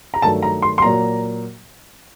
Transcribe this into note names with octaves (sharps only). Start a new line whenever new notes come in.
A#5
G2 D#3 F#3 A3 A5
A#5
C6
C6
A#2 F#3 A#3 A#5